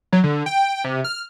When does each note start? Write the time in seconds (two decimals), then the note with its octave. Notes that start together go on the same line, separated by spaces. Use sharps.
0.13 F#3
0.24 D3
0.46 G5
0.84 C3
1.04 F6